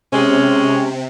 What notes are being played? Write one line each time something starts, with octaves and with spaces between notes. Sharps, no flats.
C3 G#3 C#4